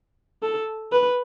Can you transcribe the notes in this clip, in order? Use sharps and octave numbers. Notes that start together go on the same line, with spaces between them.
A4
B4